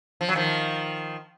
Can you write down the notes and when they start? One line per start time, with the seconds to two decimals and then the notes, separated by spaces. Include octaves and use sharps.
0.21 F3
0.29 F#3
0.35 D#3 F3